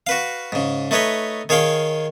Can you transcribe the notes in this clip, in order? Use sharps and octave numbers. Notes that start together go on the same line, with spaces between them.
F#4 B4 F5
G#2 C#3
A3 D#4 B4 C#5 D#5
D#3 G#4 C#5 F5 G5